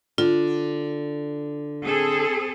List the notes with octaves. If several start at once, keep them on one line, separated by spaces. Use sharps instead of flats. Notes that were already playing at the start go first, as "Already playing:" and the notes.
D3 F4
C4 G#4 A4